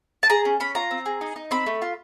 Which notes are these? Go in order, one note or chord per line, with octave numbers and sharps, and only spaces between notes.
A5
G#4 A#5
C#4
C#4 B5
F4 A#5
C4
G#4
D#4
D#4
C4 B5
A3
F4